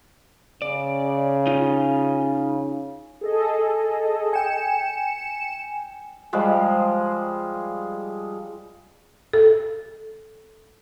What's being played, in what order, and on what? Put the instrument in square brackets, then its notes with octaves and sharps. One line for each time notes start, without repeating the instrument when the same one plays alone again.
[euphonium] C#3 [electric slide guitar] D5
[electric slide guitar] D#4 F4
[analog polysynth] G#4 A4 D#5
[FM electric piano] G5 G#5 [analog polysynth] C#7 E7
[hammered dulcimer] F3 G3 G#3
[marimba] A4